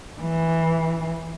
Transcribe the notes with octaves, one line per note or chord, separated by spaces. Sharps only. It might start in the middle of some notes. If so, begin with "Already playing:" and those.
E3